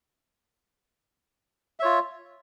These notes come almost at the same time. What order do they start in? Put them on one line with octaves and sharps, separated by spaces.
E5 C#5 F4